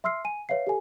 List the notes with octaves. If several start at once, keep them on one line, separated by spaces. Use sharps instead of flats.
E5 C6 E6 F6 C7
G#5 D#7
B4 C#5 E5 F5 C7
G4 A4 G#5